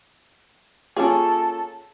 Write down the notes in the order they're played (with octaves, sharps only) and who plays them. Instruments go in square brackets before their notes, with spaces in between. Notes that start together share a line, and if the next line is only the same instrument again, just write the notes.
[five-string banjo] A#3 C#4 F4 [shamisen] G#4 [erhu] A4